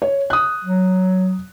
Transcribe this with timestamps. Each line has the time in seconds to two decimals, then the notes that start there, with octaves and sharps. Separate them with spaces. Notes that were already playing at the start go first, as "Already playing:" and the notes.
0.02 C#5
0.30 D#6 F#6
0.65 F#3